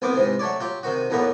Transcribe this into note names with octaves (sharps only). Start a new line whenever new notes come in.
C2 C3 B3 C4 D6
G#2 C3 E3
F#3 A3 C#5 D5
F#3 F4 G4
C3 D#3 F#4
B1 E2 A2 F#3 A#3 B3